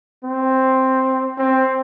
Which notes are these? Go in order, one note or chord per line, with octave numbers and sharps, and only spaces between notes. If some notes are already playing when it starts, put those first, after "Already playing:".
C4
C4